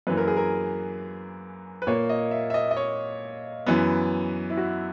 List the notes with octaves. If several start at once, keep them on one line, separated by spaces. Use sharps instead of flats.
F#2 E3 A#3 B4
A#4
G#4
A#4
B4
A#2 A#3 C#5
D#5
E5
E5
D#5
D#5
C#5
F#2 E3 B3
E4
F#4